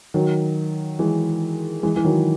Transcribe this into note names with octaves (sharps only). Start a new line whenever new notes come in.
D#3 F#3
E3 G#3
E3 G#3
E3
D#3 F#3